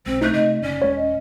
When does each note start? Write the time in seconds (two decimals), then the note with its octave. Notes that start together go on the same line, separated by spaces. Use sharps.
0.06 B1 G#3 C4 C5
0.21 A3 D#4 F#6 G6
0.33 C3 A3 D#5
0.62 F#1 C#4 D5
0.82 D#1 G#3 C#5
0.96 D#5